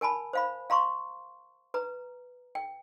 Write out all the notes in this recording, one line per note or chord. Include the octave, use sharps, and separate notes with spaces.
A#4 G#5 A5 B5
C5 F5 B5
F5 A#5 C6 C#6
B4 A#5
G5